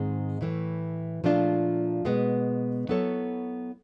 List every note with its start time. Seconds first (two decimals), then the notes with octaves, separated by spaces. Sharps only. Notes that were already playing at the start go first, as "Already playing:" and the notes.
Already playing: G#2 D#3 G#3 C4
0.41 A2 E3 A3
1.24 A#2 F3 A3 D4 F4
2.05 B2 G#3 B3
2.88 F#3 B3 E4 A4 C#5